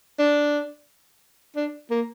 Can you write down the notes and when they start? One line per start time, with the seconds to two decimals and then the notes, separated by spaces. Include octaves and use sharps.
0.19 D4
1.56 D4
1.90 A#3